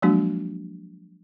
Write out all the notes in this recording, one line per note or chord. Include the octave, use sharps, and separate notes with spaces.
F3 F#3 G#3 A#3 D4 F#4